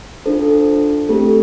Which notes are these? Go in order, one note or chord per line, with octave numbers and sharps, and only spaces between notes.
D4 F4 A4 C5
A3 C4 G4 A4